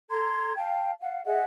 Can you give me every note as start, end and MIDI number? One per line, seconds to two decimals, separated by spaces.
0.10 0.55 69
0.10 0.55 82
0.10 0.55 84
0.10 0.55 92
0.56 0.92 77
0.56 0.92 79
0.56 0.92 81
1.01 1.21 77
1.01 1.21 78
1.25 1.45 68
1.25 1.45 75
1.25 1.45 76
1.25 1.45 78